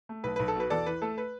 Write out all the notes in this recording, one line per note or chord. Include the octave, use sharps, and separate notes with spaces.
A3
B1 B4
B1 B4
A4
B2 B4
E2 A4 D5
E3 B4
A3 A4
B4